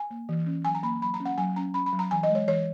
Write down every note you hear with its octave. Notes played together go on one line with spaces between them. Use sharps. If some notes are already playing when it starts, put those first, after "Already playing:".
Already playing: G#5
A#3
E3
C#4
F#3 G#5
A#5
A#3 B5
F#3 B5
A#5
C#4
F#5
F#3 G#5
C#4 A#5
C#4 B5
B5
F#3
A#5
E3 G#5
D#5
G#3
C#5
E3 C#5